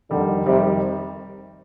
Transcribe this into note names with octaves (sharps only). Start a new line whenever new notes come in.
F2 D3 D#3 G3
F2 C3 D#3 G3